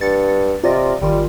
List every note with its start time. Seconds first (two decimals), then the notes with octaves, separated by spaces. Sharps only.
0.01 G2 A6 C#7
0.64 C3 F4 D5 D#5
1.01 G#1 D#3 G3 F4